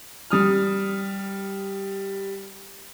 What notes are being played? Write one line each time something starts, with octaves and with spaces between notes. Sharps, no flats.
G3 D#6 F6